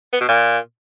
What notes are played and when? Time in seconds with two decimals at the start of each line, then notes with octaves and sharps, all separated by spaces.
0.13 B3
0.21 B2
0.28 A#2